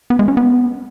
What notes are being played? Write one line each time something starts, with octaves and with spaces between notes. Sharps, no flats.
B3
G#3
C#4
B3